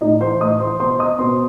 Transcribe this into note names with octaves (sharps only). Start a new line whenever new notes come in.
A2 D#4 D#5
E3 C5 C6
A2 D#5 D#6
E3 C5 C6
B2 C5 C6
D#5 D#6
B2 C5 C6